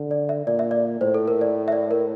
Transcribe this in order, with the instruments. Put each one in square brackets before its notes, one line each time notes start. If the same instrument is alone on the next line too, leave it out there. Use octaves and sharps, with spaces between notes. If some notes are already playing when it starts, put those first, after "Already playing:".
Already playing: [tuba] D3
[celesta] D5
E5
[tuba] A#2 [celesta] D5
[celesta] E5
D5
[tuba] A2 [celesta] C5
[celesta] A4
A#4
D5
E5
D5
A#4